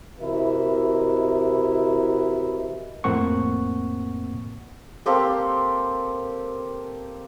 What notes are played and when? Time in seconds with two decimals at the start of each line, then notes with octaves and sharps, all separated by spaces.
0.20 C3 E3 E4 F#4 A#4 D#5
3.04 F2 A2 A#3 C4 F#5 C#6
5.06 A#3 C4 G4 A4